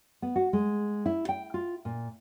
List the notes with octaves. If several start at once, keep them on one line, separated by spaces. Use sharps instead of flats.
B3
F#4
G#3
E4
G5
F4
A#2